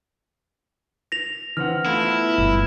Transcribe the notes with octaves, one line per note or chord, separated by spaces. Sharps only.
A#6 F7
E3 C4 F#5 F6
A3 B3 E4 F4
G1